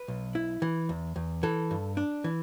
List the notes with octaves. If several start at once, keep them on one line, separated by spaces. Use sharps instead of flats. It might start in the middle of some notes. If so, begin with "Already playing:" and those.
Already playing: B4
B1
E4
E3
E2
E2
E3 A4
G2
D4
E3